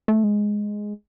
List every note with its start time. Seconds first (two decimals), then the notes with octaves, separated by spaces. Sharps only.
0.08 A3
0.24 G#3